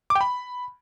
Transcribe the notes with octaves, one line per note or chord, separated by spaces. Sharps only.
D6
G5
B5